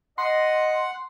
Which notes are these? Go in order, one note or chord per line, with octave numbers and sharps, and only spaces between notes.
D#5 F#5 C6